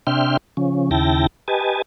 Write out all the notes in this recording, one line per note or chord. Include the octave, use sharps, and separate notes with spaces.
C3 D4 E5 G5 C6 F6
C#3 F3 C#4
D#2 C#3 E4 G5 A5 A#6
G4 B4 D#5 G#5 A5